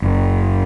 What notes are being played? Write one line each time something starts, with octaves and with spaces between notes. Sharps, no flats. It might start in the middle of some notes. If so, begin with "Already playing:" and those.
F#1